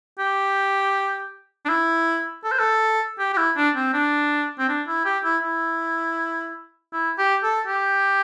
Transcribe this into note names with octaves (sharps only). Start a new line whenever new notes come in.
G4
D4
E4
A4
C5
A4
G4
G4
E4
D4
C4
D4
C4
D4
E4
G4
E4
E4
E4
G4
A4
G4